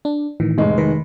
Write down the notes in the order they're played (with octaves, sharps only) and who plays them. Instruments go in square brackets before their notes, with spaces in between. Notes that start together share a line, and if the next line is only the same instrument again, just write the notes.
[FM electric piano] D4
A2 D#3 E3
[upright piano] F1 G#3
[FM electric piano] D#3 B4